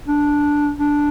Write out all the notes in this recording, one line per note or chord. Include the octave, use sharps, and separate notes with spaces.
D4
D4